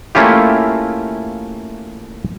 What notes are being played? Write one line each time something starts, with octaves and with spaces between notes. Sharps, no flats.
A3 A#3 C#4 E4 F4 G4